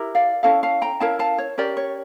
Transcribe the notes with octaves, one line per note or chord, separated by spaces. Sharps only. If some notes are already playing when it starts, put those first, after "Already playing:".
Already playing: E4 G4 A#4
D5 F5
C#4 E4 A4 F5 A5
F5 A5
G5 A#5
C#4 E4 A#4 F5 A5
F5 A5
C#5
C#4 G4 A#4 D5
C#5